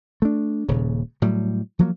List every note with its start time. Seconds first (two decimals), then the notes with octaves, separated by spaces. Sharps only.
0.22 A3 D4
0.69 D#1 A#2 C#3
1.22 A2 F#3 G3
1.79 F3 F#3 A#3